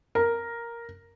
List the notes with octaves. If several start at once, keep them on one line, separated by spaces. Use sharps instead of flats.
A#4